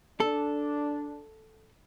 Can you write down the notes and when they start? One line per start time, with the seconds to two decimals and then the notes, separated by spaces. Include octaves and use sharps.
0.20 D4 A4